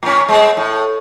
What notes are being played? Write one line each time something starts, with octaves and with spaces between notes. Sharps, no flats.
A2 C#4
G#3 B3 C4
A2